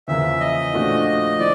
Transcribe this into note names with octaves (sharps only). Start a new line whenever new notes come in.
E2 C#3 F3 A#3 E5
D#5
A#2 F3 A3 D4 F#4
F3 D5